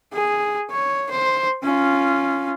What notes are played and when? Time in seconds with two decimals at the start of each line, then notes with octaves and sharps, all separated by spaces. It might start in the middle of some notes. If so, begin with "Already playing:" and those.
0.13 G#4
0.71 C#5
1.11 C5
1.63 C#4 F4